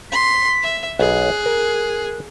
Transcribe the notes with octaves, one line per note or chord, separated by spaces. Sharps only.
C6 B6
E5
B1 G#4 F#6
A#4